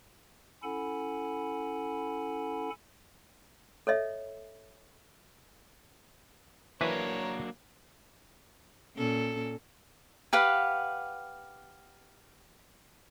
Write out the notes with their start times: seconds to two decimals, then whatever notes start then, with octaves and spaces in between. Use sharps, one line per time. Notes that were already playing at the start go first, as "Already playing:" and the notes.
0.63 C#4 E4 A4 F#5 G#5 B5
3.87 A4 C#5 D#5 E5
6.81 E3 F#3 A#3 D4 A#4 B4 C#5
8.96 A#2 C#4 A4
10.33 G4 B4 F5 F#5